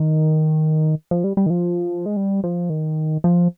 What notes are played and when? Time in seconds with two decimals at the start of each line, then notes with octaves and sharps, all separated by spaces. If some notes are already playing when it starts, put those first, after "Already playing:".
Already playing: D#3
1.11 F3
1.24 G3
1.37 G3
1.46 D#3
1.50 F3
2.06 G#3
2.16 G3
2.44 F3
2.70 D#3
3.24 F3